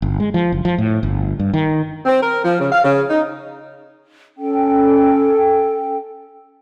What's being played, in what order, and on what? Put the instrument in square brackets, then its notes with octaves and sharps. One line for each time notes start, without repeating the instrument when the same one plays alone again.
[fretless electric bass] G1
G#3
F3
F#1
F3
A2
G1
G2
D#3
[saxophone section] C4
A#4
F3
C#3
F5
C#3
D#4
[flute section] C#4 A4 G5